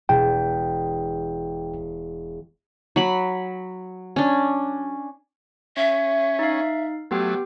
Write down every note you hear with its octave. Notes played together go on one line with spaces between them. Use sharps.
E1 G5
F#3 B5
C#4 D4
C#4 E5
D#4 F5
F#3 A3 B3 G4 G5